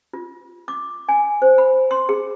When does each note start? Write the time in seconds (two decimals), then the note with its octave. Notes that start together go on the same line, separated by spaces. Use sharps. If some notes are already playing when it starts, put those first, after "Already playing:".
0.13 F4
0.68 D6
1.09 G#5
1.42 C5
1.58 B5
1.91 C6
2.09 G#4